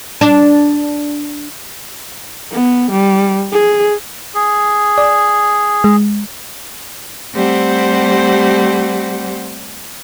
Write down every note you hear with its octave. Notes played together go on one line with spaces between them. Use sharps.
D4
B3
G3
G#4
G#4
D5
G#3
G3 A3 C4 G4 C5 F#5